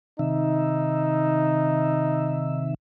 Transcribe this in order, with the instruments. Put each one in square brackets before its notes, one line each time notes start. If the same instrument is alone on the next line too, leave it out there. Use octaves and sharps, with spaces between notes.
[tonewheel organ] C3 D#3 E5 [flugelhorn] D#4